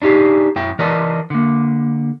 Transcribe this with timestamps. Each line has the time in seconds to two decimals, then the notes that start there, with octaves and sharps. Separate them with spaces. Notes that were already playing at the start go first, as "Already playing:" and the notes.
0.02 D4 D#4 G4 G#4
0.56 F#2 E4 G5
0.79 E3 A#4 D5 D#5 A5
1.30 D3 A#3